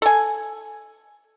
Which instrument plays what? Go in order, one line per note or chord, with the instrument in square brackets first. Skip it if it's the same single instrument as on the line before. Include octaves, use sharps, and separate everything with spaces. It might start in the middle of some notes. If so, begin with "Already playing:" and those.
[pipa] A4 G#5